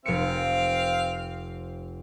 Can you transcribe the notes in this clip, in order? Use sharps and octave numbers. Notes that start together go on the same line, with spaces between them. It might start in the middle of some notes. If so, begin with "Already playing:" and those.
F1 C4 F5 C#7